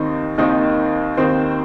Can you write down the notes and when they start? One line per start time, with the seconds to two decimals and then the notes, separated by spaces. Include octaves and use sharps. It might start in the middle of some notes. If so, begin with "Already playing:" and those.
Already playing: D#2 D#3 C4 D#4
0.38 D#2 D#3 C4 D#4 C5
1.17 D#2 D#3 C4 D#4 C5